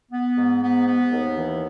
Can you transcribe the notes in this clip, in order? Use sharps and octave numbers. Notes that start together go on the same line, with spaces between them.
B3
G#2
B3
B3
D#2
E3